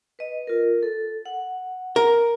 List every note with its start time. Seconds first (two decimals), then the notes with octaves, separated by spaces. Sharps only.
0.19 B4 D#5
0.47 F4 A#4
0.83 A4
1.26 F#5
1.96 A#4